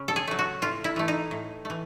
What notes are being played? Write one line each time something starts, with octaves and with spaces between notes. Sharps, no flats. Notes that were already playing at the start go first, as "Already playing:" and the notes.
Already playing: C#3
A4
G#4
F#3 A3
F#4
A2 F4
E4
E3 A3
D#4
A2
E3 A3